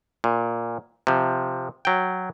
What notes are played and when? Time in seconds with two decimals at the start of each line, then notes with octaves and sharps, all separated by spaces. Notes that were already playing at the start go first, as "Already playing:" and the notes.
0.24 A#2
1.07 C3 F3
1.85 F#3 G5